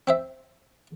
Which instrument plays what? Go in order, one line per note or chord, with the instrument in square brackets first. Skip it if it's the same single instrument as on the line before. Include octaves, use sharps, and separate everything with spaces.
[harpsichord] C4 C5 E5